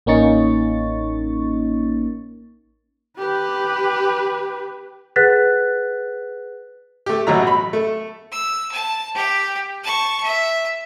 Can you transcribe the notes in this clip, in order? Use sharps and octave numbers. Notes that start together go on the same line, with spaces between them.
A1 A#3 C#4 D#4 C#6 A6
G4 B4
G#4 B4 F#5 F#6 A6 B6
A3 G4
A1 B2 F#3 E5 A#5
B5
A3
E6
A5
G4 G5
A5 C#6
E5